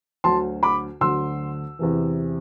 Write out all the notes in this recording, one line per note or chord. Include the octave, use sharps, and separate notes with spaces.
D2 D3 F#3 A5 C6
B5 D6
D2 D3 F#3 C6 E6
E2 C3 E3